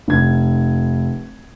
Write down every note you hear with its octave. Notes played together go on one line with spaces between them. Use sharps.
F1 G#6